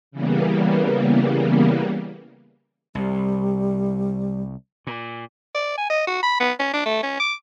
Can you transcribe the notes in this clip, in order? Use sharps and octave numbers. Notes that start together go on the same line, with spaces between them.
C#3 E3 G3 A#3 B3
C2 G3
A#2
D5
G#5
D#5
F#4
B5
B3
C#4
D4
A3
C#4
D6